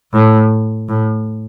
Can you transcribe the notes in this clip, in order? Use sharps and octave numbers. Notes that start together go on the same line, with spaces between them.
A2
A2